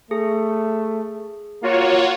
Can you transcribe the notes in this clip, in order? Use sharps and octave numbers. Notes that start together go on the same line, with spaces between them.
A3 G#4
A#3 F4 F#4 C#5